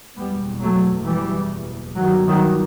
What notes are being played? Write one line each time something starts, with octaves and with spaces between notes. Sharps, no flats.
F#1 E2 B2 G3 B3
F#3 A3
E3 G3
G1 G2 D#3 F#3
D#3 F#3